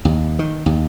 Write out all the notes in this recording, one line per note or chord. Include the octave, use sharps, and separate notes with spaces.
D#2
D#3
D#2